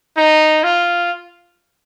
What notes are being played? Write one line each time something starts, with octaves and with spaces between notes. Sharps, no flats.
D#4
F4